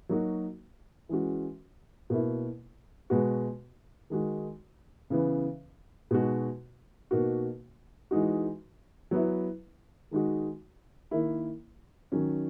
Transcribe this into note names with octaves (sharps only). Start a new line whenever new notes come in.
F#3 A#3 D#4 F#4
E3 G#3 C#4 F#4
B2 A#3 E4
B2 G#3 B3 F#4
D#3 G#3 D#4 F#4
C#3 E3 B3
B2 G#3 D#4 F#4
B2 A#3 D#4 F#4
E3 G#3 D#4 F#4
F#3 B3 E4
D#3 G#3 D#4 F#4
D#3 A#3 E4
D#3 F#3 C#4